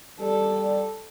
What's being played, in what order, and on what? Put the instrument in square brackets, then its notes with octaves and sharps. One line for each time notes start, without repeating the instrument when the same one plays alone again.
[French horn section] G3 D5 [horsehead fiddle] A4